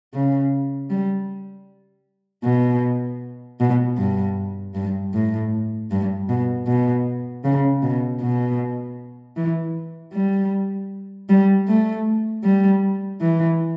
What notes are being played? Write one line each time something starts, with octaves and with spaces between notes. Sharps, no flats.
C#3
G3
B2
B2
G2
G2
A2
G2
B2
B2
C#3
B2
B2
E3
G3
G3
A3
G3
E3